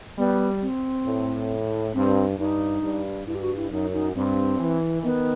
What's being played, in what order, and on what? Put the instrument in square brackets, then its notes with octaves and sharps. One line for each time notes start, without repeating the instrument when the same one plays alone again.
[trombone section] G3 [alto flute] B3
[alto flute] C4
[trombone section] A2
[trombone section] G2 [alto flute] C4
[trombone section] G2 [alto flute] D#4
[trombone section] G2
[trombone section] G2 [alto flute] E4
[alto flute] G4
F#4
E4
[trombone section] F#2 [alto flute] D#4
[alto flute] D#4
[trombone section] G2 [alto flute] C4
[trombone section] E3
[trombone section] D#3 [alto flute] B3